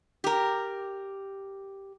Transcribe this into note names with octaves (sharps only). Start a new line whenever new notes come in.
G4 A#4